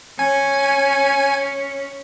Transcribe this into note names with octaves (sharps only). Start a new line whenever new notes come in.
C#4 G#5